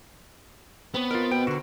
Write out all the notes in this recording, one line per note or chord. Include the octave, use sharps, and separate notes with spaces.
B3 C4 C#5
F4 A#4 D#5
B2 G5
D3 F#4 A#4 C5